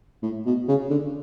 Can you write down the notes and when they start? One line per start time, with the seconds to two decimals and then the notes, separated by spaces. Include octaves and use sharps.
0.23 A2
0.46 B2
0.68 C#3
0.90 D3